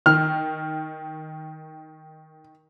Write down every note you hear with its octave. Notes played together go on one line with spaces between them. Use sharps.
D#3 F6